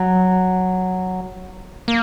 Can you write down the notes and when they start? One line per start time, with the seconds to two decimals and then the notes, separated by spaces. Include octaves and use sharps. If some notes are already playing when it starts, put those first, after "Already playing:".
Already playing: F#3
1.88 A#3